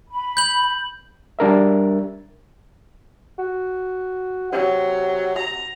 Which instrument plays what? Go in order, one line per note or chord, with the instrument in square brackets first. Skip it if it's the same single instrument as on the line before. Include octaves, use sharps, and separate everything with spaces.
[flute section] B5
[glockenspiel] G6 F#7
[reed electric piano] G3 D4 A#4 E5
[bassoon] F#4
[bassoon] C3 [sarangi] F#3
[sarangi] A#5